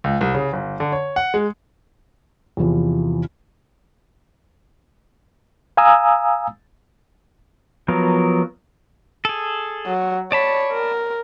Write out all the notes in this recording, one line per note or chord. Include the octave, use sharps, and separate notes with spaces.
C#2
C2
C#3
G1
D3
C#5
F#5
G#3
E2 C3 E3 F3
F5 G#5 A#5 D#6 E6
F3 F#3 B3 A#4
G#4 A4
F#3
C#5 D5 A5 B5
A#4